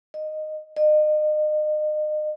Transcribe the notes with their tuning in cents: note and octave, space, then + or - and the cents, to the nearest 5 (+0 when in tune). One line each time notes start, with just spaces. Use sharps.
D#5 -10
D#5 -35